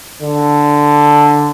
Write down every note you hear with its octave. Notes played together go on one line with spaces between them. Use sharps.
D3